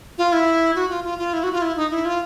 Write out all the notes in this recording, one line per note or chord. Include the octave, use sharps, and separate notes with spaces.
F4
E4
F#4
F4
F4
F4
E4
F#4
F4
E4
D#4
E4
F4